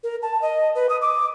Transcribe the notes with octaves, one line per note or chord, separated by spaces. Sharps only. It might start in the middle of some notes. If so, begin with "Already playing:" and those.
A#4
A5
D#5
B4
D#6
D6